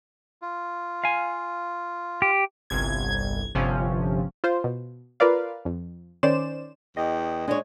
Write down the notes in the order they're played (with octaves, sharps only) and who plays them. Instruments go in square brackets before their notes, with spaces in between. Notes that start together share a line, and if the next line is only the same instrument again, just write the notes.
[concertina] F4
[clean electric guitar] F5 G#5
[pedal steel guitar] G4
[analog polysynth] G1 C2 G#6
G1 C3 F3 C#4
[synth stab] F4 C5
B2
F4 A#4 B4 D5 F5
F2
D#3 C#4 C5 D5 E7
[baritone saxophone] E2 [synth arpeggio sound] D#5 [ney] G5
[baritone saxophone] G#3 [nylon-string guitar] D4 C#5